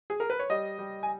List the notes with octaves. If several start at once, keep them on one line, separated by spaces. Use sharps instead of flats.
G#4
A#4
B4
C#5
G3 D#5
G3
G#5